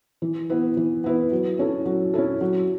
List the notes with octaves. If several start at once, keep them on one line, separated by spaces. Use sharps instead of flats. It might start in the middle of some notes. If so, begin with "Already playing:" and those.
E3
B3 E4 B4
E3
B3 E4 B4
F#3
C#4 E4 A4
F#3
C#4 E4 A4
F#3